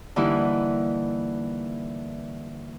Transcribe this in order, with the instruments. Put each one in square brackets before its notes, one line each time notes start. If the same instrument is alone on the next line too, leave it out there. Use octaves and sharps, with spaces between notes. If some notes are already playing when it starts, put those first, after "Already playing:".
[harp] D3 E3 G3 A#3 D#4 E4